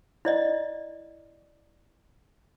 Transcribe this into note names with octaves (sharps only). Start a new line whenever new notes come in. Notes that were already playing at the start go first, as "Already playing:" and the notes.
E4 D5 D#5